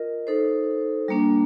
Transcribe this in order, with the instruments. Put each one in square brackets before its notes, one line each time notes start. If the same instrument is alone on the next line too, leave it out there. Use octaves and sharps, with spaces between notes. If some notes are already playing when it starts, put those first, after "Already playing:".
Already playing: [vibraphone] F4 A#4 D#5
D#4 A4 C5
G3 A#3 D4